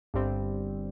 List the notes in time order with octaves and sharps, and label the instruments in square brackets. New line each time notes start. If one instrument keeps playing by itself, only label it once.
[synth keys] G1 G2 G3 C4